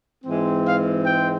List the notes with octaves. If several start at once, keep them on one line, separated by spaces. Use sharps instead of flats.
G#2 E3 G#3 C4
F5
G5